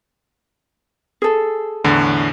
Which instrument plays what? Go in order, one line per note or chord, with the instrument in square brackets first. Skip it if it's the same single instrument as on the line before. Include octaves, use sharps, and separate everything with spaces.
[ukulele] G#4 A4
[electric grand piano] E2 A2 D3